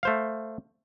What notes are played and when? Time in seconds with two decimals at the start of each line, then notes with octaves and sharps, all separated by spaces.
0.03 A3 C5 F5